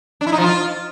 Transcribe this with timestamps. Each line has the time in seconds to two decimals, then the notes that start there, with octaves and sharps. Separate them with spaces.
0.21 D4
0.27 E4
0.32 D#4
0.38 F3
0.44 F4